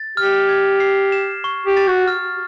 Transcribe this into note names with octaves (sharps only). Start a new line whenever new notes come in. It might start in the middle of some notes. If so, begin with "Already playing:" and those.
Already playing: A6
G4 F6
G#6
C7
E7
C#6
G4
A6
F#4
F6